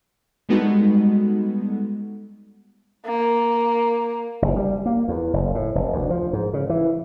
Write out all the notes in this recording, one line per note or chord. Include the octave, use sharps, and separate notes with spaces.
G3 G#3 B3 D#4 F#4 A4
A#3
F#1
G3
A#3
E2
F#1
A2
F1
D2
F3
G#2
C#3
E3